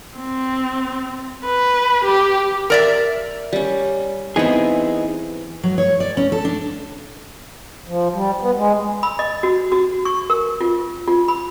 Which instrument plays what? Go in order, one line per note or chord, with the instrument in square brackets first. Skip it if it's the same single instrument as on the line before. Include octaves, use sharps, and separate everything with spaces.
[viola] C4
B4
G4
[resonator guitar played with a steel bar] A#4 D5 E5
[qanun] G3 C#4
[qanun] E3 C4 [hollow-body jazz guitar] B3 D#4 G#4
[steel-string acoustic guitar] F#3
C#5
D5
C#4
A4
D4
[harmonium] F3
G3
B3
G#3
[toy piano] B5
D#5
F#4
F#4
C#6
A#4
F4
F4
B5